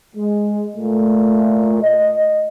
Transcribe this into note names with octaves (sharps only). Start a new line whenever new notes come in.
G#3
A#2 A3
D#5